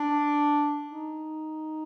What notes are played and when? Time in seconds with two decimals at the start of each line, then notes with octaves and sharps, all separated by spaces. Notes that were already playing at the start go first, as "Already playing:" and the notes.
Already playing: D4
0.89 D#4